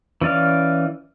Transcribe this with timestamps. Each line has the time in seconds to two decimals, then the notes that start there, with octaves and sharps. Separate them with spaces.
0.21 E3 C#4 D5 F5